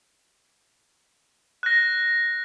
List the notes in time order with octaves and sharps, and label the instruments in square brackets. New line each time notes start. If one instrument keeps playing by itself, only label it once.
[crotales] F#6 A#6